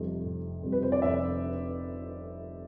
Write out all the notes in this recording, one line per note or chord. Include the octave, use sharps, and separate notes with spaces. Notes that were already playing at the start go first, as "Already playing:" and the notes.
Already playing: F1 F2 C3 G3
F1
F2 C3 G3
B4
C5
D5
F1 E5